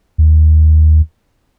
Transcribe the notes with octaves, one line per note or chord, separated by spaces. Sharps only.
D#2